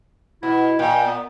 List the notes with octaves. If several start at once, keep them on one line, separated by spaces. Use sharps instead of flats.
B2 E4
A#2 G5
B3